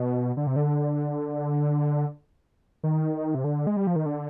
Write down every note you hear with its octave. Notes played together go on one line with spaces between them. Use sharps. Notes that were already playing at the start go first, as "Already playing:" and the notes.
Already playing: B2
D3
C3
D3
D#3
C3
D3
G#3
G3
F3
D#3
D3